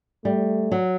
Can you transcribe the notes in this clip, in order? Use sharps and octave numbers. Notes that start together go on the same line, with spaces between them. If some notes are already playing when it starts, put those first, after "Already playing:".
G3 A3
F#3